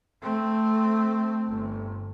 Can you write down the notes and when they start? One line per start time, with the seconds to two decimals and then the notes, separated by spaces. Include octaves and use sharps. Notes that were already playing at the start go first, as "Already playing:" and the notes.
0.22 A3 C4
1.47 G1